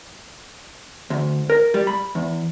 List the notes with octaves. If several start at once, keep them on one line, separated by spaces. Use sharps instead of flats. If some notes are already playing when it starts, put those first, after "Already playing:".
D2
A#4
G3
B5
E2